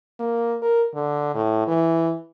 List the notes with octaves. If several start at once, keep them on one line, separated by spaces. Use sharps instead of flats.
A#3
A#4
D3
A2
E3